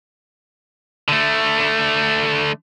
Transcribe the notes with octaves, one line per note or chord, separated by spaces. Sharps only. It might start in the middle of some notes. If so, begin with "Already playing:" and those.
D3 A3